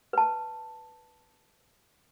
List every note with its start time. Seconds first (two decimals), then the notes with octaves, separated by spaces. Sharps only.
0.13 B4 A5